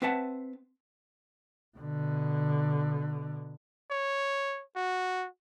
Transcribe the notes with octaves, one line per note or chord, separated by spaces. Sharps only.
C4 B4 E5 F#5 A5
B2 D3
C#5
F#4